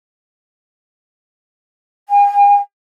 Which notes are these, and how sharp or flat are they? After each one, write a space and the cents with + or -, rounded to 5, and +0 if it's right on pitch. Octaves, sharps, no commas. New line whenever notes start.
G#5 -40